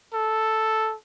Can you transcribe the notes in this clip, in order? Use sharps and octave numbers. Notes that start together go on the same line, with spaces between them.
A4